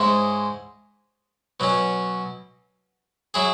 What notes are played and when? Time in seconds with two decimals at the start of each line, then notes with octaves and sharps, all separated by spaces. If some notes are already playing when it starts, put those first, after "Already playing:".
Already playing: G#2 G#3 E4 C#5
1.60 B2 F#3 C#4
3.34 F#3 E4 G#4